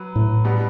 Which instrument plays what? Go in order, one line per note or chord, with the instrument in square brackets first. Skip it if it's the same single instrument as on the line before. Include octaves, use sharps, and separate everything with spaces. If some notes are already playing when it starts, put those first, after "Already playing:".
Already playing: [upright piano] F#3 B4
[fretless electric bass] A2
[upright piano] B2 G3 B3